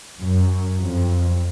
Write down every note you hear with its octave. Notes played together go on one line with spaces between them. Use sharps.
F#2
F2